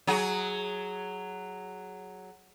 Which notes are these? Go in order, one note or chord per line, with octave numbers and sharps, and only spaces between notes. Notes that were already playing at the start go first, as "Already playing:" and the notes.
F#3 F#4 G#4